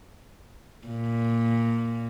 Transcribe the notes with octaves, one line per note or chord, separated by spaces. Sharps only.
A#2